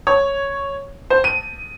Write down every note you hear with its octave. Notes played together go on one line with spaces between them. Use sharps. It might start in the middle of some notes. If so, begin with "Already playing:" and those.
C#5
C5
D#7